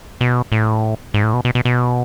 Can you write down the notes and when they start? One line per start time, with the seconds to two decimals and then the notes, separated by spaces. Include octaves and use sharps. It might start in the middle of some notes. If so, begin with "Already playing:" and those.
0.21 B2
0.52 A2
1.14 G#2
1.23 A2
1.34 B2
1.45 B2
1.55 B2
1.65 B2